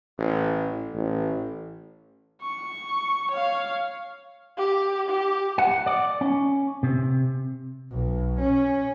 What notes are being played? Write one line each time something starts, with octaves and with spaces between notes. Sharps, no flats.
A1
A1
C#6
C#5 F5
G4
G4
F#5
D5
C#4
C3
B1
C#4